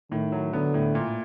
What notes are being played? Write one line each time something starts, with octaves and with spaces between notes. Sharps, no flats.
A2 D#3
F#3
D3 B3
A2
A#2